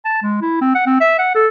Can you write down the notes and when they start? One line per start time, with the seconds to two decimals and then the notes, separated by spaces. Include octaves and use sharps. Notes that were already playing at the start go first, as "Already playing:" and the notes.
0.05 A5
0.23 G#3
0.42 E4
0.61 C4
0.75 F#5
0.87 C4
1.01 E5
1.19 F#5
1.35 A4